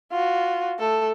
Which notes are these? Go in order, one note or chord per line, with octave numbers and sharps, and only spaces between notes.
F4 F#4
A3 A4